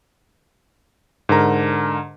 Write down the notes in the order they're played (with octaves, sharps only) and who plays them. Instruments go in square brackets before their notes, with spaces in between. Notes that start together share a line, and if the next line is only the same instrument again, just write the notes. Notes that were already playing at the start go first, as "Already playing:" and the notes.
[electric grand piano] G#2 D3 A#4 A#5